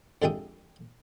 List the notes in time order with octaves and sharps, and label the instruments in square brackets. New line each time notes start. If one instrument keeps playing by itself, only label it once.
[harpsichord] F2 D3 G#3 G4 E5 D#6